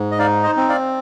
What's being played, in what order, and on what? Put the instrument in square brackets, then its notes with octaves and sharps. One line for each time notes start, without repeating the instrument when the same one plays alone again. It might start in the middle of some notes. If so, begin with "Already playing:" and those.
Already playing: [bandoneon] G#2
D#5
D#4 D5 F5
C5 D#5
C4
D5 F5